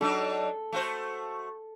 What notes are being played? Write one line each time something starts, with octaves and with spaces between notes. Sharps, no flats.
F#3 D4 D#4 A4
A3 F#4 C5